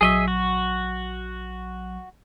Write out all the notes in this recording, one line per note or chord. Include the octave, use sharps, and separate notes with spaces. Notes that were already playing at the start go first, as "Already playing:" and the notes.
A#1 F#3 G#4 D#5 E5 C#6
F#4